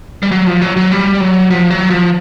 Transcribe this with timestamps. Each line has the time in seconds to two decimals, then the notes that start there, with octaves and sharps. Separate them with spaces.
0.23 G3
0.31 F#3
0.47 F3
0.61 F#3
0.77 F#3
0.92 G3
1.21 F#3
1.50 F3
1.70 F#3
1.91 F3